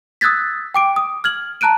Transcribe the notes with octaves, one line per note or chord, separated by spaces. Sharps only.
D#6 E6 F#6 G#6 A6 B6
G5 D6 D7
D#6
F6 G#6 F#7
A5 A#5 F#6 D7 D#7